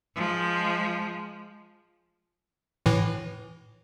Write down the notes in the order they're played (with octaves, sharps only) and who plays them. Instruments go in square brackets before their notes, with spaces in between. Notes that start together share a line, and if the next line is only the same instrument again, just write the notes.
[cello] F3 G#3
[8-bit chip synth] A2 E3